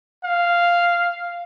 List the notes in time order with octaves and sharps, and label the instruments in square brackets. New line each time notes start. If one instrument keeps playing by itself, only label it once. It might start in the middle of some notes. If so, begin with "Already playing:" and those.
[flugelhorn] F5